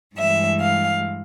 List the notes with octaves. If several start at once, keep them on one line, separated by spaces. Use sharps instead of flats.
G2 E3 G#3 E5
F5